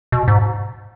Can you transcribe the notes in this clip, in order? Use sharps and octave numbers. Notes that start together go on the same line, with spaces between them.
B2
G#2